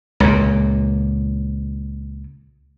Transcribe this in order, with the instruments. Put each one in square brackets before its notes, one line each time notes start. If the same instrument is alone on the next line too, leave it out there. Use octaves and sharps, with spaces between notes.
[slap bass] C#2 A#2